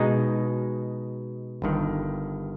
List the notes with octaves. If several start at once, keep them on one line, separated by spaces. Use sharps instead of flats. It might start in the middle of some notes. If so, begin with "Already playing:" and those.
Already playing: B2 G#3 D#4 G#4
G1 G2 D#3